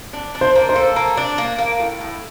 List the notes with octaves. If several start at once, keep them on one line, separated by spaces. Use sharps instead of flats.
D4
D4
C5
A#3
C5
A4
A#3
D4
A#3
A#3
A2
A2